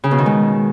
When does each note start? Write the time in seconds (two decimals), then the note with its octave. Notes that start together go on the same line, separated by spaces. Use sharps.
0.04 C#3
0.11 B2
0.18 D#3
0.26 G#3